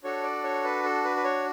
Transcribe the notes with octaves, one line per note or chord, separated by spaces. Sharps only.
D4 F#4 A4 C#5
D5
C#5
B4
A4
B4
B4
C#5